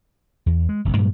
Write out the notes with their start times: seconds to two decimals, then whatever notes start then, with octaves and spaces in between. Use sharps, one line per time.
0.46 E2
0.69 G#3
0.85 F#1 B1
0.97 G2 A#2 F#3 G#3